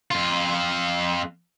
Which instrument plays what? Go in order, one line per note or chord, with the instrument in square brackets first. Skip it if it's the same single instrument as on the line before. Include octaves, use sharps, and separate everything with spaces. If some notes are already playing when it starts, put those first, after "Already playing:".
[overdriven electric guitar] F2 F4